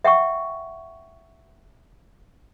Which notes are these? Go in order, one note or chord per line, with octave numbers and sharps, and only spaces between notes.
E5 F#5 G5 C#6